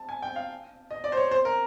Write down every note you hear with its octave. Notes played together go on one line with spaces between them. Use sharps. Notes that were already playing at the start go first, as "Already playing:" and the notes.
Already playing: A5
G#5
G5
F5
D#5
D5
C5
C#5
C5
A#4